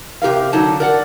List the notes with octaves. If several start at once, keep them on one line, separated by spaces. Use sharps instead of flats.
C3 G4 A#4 F5
D3 F#3 D#4 A5
A#4 D5 F#5